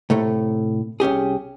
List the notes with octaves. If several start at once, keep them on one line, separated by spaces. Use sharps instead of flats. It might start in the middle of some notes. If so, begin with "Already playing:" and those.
A2 C3 A3
C2 C#4 G4 G#4